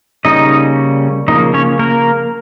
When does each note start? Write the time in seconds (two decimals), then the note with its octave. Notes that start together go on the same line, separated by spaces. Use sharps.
0.25 C#3 G3 A#3 C#4 D#4 D#5
1.28 C#3 F3 A#3 D#4 D#5
1.54 C#4 C#5
1.79 A#3 A#4